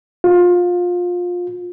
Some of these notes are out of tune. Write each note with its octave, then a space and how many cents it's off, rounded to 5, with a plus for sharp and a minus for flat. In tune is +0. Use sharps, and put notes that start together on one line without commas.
F4 +25